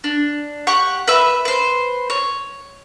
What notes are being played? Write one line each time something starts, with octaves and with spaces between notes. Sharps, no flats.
D4
G4 F#5 C#6
B4 E5 B5
B4 C5
C#5